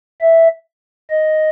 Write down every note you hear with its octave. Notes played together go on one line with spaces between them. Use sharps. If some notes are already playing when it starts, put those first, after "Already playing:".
E5
D#5